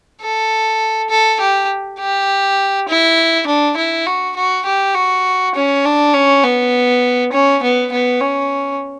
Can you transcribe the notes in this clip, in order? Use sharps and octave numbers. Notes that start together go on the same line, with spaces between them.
A4
A4
G4
G4
E4
D4
E4
F#4
F#4
G4
F#4
C#4
D4
C#4
B3
C#4
B3
B3
C#4